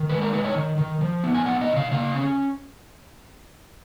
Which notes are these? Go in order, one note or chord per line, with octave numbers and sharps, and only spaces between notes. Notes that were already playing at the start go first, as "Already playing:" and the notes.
Already playing: D#3
G#3 B4
A#4
D#4 B4
C#5
D#3
D#3
F3
B3
G#5
D#4 F#5
D#5
C#3
F5
A#3 F5
C#4